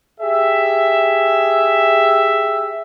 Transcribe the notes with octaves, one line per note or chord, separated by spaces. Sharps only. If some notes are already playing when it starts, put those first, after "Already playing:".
G4 G#4 E5